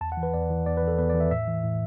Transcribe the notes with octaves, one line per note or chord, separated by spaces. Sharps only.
E2 A5
F#5
E3
B4
E2 D5
E3
E2 D5
B4
E3
A4
E2 B4
D5
E3
E5
A2 E5
E3
A2